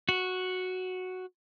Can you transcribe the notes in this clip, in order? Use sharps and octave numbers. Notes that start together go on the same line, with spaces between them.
F#4